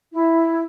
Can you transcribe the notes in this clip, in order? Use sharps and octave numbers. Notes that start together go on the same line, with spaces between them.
E4